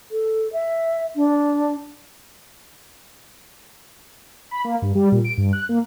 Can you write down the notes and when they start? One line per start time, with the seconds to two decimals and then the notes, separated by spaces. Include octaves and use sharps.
0.11 A4
0.53 E5
1.16 D4
4.51 B5
4.64 A#3
4.82 G2
4.95 G3
5.12 A#2
5.24 D7
5.38 G2
5.53 F#6
5.69 A#3